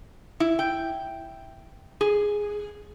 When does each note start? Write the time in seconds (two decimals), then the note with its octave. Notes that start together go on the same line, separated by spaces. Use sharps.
0.40 E4
0.59 G5
2.01 G#4